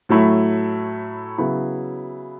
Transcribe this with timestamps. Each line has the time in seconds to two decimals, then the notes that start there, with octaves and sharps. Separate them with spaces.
0.09 A2 F#3 A3 E4
1.38 C#3 F#3 B3 E4